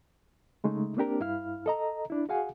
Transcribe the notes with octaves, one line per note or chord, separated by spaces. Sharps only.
C#3 G#3 A3 D#4
A#3 C4 D4 G4 A#4
G2 E4 F5 F6
A4 D#5 A#5
D4 E4
F#4 G#4 F5 F#5 G#5